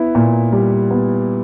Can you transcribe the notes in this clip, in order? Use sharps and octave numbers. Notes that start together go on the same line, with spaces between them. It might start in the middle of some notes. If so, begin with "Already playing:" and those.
Already playing: B3 E4
A#2
G3
B3